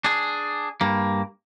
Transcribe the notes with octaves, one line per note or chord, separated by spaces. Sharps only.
D4 G#4
G2 A#3